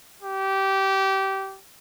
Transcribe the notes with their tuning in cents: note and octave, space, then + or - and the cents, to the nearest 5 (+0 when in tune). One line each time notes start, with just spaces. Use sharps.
G4 -20